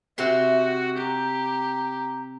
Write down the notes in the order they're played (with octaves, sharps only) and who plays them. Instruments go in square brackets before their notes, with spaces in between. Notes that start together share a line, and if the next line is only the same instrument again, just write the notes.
[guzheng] C3 C4 C6 [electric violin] F#4 [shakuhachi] E5
[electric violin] G4 [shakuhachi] A#5